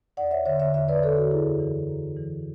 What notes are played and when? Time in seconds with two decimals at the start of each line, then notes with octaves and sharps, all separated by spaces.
0.17 E2 D5 F#5
0.31 C#5 E5
0.45 D3 C#5 E5
0.60 C#5 E5
0.74 E2 C#5 E5
0.88 B4 D5
1.03 D3 A4 C#5
1.17 F#4
1.31 F#2 E4 G#4
1.60 E3
1.89 F#2
2.17 E3